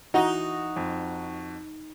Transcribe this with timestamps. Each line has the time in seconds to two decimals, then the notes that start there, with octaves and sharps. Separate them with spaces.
0.14 E3 D#4 F#4
0.76 F2